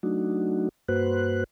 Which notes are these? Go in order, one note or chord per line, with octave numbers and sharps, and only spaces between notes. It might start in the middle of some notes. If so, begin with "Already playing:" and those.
F#3 A3 D4 D#4 F#4
G2 A#3 F#4 B4 C5 F#6